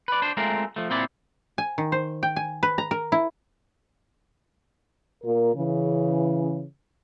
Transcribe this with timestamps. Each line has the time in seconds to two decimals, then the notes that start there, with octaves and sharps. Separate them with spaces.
0.08 B4 D5
0.22 D4 C5
0.37 G#3 A3 C4 F4 A#4
0.76 F3 A3
0.90 A#2 C4 E4 D5
1.58 G#5
1.78 D#3
1.92 C5
2.23 G5
2.36 G#5
2.63 B4
2.78 A#5
2.91 A#4
3.12 E4
5.23 A#2 F4 A#4
5.55 C#3 E3